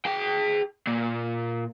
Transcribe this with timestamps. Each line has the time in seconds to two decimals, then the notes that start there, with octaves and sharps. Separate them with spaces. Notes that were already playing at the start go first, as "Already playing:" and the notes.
0.05 G#4 G5
0.87 A#2